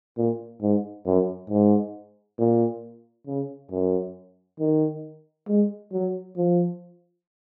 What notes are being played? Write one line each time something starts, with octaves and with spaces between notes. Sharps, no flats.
A#2
G#2
F#2
G#2
A#2
C#3
F#2
D#3
G#3
F#3
F3